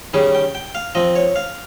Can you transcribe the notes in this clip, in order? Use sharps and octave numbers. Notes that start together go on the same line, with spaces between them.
D#3 G3 C#4 G#4
G5
G5
F5
F3 C4 D#5
C#5
F5